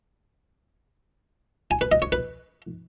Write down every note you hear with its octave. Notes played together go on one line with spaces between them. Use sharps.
G#5
B4
D#5
C#5
B4